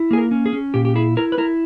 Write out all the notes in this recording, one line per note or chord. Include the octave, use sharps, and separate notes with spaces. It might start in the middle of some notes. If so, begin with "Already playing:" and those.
Already playing: E4
A#3 G#4
A#4
C#4
G#4
C#4
A#2 G4
G4
E4 G#4
E4 A#4
B4
E4 A#4